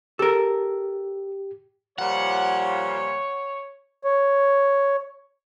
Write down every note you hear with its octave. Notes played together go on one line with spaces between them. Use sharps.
G4 A4 A#4
A#2 F3 G3 C#5 F#5
C#5